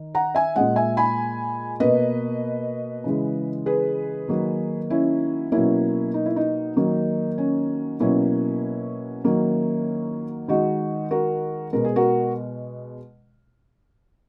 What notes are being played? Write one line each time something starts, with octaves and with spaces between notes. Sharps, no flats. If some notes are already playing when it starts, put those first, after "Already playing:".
Already playing: D#3
F#5 A#5
E5 G#5
A#2 G#3 D#5 F#5
E5 G#5
G#5 B5
B2 A#3 B4 D#5
C#3 E3 G#3
G#4 B4
D#3 F#3 A#3
C#4 E4
B2 F#3 A#3 C#4 E4
D#4
E4
D#4
D#3 F#3 A#3
C#4
B2 F#3 A#3 C#4 E4
D#3 F#3 A#3
D#3 G#3 D#4 F#4
F#4 A#4
B2 G#3 A#4
G#4
F#4 A#4